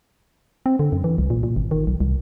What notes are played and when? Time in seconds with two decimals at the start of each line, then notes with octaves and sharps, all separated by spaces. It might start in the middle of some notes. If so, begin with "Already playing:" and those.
0.66 C4
0.79 D3
0.92 F#2
1.04 E3
1.18 C2
1.30 A#2
1.43 A#2
1.56 G#1
1.71 D#3
1.87 B1
2.00 C2